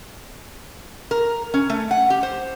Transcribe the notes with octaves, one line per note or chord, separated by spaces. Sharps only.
A#4
C#4
A3
F#5
G4
C5